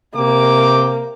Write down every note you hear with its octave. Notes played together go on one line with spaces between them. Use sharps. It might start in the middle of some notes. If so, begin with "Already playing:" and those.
C3 A#3 G5 D6